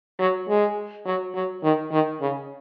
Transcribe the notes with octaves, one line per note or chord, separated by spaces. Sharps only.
F#3
G#3
F#3
F#3
D#3
D#3
C#3